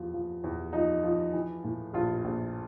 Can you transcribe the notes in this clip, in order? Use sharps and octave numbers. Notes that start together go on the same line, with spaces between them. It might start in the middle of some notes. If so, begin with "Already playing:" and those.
Already playing: E2 F3
F3
E2
F3 D#4
F3
E3
A2
A#1 F4
A#1